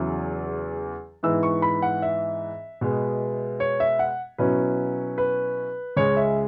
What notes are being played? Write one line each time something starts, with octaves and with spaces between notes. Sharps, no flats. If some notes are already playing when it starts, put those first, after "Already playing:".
Already playing: E2 C#3 F#3 E4
G#2 E3 B3 E4 E6
C#6
B5
F#5
E5
B2 G#3 B3
C#5
E5
F#5
B2 F#3 C#4 E4 B4
B4
C#2 C#3 G#3 C#5
E5